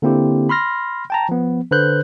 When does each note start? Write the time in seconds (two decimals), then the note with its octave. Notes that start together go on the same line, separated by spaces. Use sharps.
0.02 D3 A#3 C4 E4 G4
0.49 B5 C6 F6 A#6
1.10 G5 A5 A#5
1.29 F3 B3
1.71 D3 B4 C5 F#6 G6